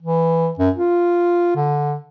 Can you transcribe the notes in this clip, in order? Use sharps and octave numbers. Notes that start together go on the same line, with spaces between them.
E3
F#2
F4
D3